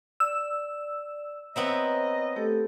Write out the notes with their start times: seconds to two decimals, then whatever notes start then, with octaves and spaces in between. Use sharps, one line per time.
0.20 D5 E6
1.56 B3 C4 C#5 D#5 E5 A#5
2.36 A3 G4 A4